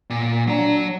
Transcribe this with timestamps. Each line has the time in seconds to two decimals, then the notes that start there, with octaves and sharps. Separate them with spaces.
0.10 A#2
0.47 F#3 D4 A#5